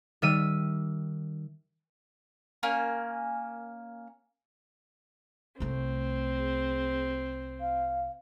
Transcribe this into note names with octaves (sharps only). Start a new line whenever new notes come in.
D#3 G3 E5 D#7
A#3 C#4 G#5
C2 A3 C4
G#4
F5